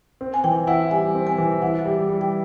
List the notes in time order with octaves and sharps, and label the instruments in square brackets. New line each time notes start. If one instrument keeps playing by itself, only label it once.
[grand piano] C4
[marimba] G#5
[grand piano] E3 [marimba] G5
[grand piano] E4 [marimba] F#5
[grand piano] G3 [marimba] G#5
[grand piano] C4
[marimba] G#5
[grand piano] E3
[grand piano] E4 [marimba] F#5
[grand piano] G3
G3
[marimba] G5